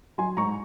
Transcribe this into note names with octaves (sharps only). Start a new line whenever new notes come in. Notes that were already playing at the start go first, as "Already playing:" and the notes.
F#3 G#5 C6
G#2 A#5 C#6